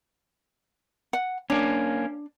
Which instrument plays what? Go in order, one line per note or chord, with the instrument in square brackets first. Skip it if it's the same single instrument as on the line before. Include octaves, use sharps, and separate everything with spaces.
[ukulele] F#5
[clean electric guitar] A#3 C#4 [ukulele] D4